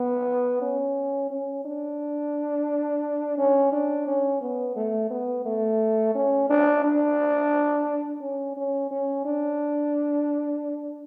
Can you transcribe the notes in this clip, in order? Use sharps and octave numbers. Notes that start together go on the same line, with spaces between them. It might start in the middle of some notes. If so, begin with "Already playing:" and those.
Already playing: B3
C#4
C#4
D4
C#4
D4
C#4
B3
A3
B3
A3
C#4
D4
D4
C#4
C#4
C#4
D4